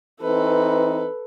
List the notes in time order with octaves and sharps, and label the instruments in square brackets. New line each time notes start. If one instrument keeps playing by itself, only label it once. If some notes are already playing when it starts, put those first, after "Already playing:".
[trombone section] E3 C4 D#4 [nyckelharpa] A4 B4